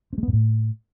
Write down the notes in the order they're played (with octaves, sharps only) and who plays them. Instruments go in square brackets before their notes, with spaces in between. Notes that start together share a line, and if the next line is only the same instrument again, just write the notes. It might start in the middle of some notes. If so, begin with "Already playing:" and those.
[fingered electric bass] C4
G#3
B3
G#2
A2